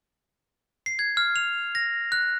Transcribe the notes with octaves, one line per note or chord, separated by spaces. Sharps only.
C7
G#6
F6
F7
A#6
F#6